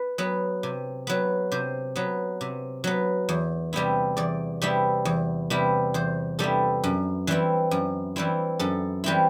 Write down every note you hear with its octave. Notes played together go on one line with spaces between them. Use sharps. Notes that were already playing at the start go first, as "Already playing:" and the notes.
Already playing: B4
F#3 B3
C3
F#3 B3
C3 C5
F#3 B3
C3
F#3 B3
E2
C3 G3 B3 E4
E2 D5
C3 G3 B3 E4
E2
C3 G3 B3 E4
E2 C5
C3 G3 B3 E4 A4
F#2
E3 G3 C4 E4
F#2
E3 G3 C4 E4
F#2 A4
E3 G3 C4 E4